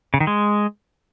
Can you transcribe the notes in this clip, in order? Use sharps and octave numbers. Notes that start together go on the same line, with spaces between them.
C#3
D#3
G#3